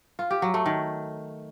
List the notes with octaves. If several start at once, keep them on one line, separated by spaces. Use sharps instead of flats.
F4
G4
F#3
A3
D#3